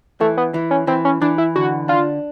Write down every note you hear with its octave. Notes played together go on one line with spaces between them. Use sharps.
E3 A3
B3
E3
C#4
E3 C4
C#4
E3 D4
E4
D3 F#4
D4 F4